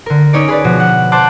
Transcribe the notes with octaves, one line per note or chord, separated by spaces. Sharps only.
D3 A#4
C#4 D#4 C#5 D5
G#4 B4 D5
B2 F3 F#4
F#5
C5 A5 D6 F#6